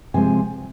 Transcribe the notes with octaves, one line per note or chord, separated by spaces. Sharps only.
C3 F3 G#3 C4 G#5